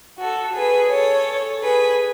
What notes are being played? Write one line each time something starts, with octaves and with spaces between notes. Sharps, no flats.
F#4 A4
G#4 B4
A4 C#5
G#4 B4